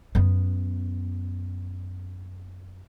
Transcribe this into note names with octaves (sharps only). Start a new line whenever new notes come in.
F#2 B3